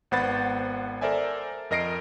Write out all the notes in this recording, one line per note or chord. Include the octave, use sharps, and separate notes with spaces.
G#1 B3 C5 F#5 B5 A6
A4 A#4 C5 D5 E5 G#5
F2 A#4 D#5 A#6 C7 D7